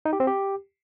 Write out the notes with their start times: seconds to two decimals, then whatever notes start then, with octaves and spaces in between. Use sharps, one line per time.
0.05 D#4
0.13 G4
0.20 C4
0.27 G4